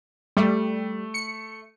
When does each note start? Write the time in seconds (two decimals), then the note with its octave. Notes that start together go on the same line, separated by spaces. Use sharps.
0.37 G3 A3
1.14 C#7